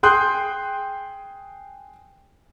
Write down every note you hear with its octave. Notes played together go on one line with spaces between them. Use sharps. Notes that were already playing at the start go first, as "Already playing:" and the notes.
G#4 G5 C6 D#6 F#6 G6